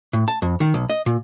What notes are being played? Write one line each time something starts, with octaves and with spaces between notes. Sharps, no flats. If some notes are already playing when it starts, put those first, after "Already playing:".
A2
A5
F2
D#3
B1
D#5
A#2